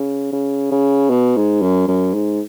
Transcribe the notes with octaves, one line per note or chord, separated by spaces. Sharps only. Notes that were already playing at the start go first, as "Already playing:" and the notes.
Already playing: C#3
C#3
C#3
B2
G#2
F#2
F#2
G#2